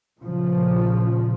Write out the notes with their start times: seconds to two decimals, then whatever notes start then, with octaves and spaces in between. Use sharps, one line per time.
0.22 A#2 C#3 F3